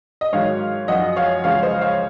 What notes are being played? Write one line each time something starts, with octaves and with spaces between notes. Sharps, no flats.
D#5
G#2 D#3 F#3 C#5 F5
F#2 F3 D#5 F#5
C#5 F5
C#2 C#3 F3 C#5 F5
C5 D#5
C#5 F5